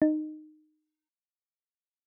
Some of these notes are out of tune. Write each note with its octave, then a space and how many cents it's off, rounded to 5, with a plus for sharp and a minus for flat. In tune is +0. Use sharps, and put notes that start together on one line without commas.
D#4 -20